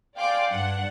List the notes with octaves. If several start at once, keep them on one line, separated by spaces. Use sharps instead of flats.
D5 F5 G5 G#5 C6 D6
G2 D4 F#5